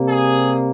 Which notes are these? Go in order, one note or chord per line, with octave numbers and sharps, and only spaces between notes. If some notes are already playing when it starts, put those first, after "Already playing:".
Already playing: C3 G3 A#3
G#4